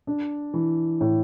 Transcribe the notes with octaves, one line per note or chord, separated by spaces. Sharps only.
D4
E3
A2